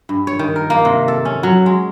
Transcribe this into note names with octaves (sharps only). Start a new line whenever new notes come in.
G2
C#5
D#3
A#4
A#3
C3
A4
C#4
F#3
G#3